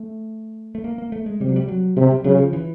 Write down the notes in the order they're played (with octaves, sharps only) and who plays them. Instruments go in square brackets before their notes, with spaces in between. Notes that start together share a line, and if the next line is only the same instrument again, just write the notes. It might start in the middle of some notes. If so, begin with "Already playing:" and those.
Already playing: [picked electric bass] A3
A3
A#3
A#3
A3
G#3
[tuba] C3 [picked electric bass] G3
[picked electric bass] F#3
G3
F#3
[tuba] C3 [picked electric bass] G3
[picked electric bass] G3
[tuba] C#3 [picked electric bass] F#3
[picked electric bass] F3
E3